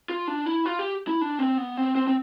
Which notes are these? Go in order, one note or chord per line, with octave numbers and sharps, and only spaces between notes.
F4
D4
E4
F4
G4
E4
D4
C4
B3
C4
C4
C4